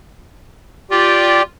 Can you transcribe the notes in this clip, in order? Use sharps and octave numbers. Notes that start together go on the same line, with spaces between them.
F4 G4 D5